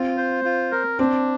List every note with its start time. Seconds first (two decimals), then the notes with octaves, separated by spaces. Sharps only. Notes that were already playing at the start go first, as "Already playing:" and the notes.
Already playing: C4 F4
0.17 C5
0.44 F4
0.71 A#4
0.99 C4 D4